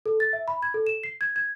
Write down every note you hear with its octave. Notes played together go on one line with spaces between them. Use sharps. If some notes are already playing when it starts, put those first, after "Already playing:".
A4
A6
E5
B5
G#6
A4
E7
C7
G#6
G#6